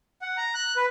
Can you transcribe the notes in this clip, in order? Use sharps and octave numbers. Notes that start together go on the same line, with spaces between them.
F#5
A#5
F#6
B4